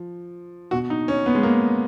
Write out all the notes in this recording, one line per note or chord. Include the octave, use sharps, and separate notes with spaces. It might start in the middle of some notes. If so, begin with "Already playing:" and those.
Already playing: F3
B2 F#4
D#4
C#4
B3
G#3
A#3